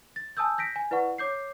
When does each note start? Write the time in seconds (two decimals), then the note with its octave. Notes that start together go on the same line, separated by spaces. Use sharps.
0.16 A6
0.37 G#5 A5 D#6 E6 G6
0.58 G6 A#6 B6 D7
0.76 G#5
0.91 E4 B4 D5 F#5 C#6
1.18 C#5 D6 G6 C7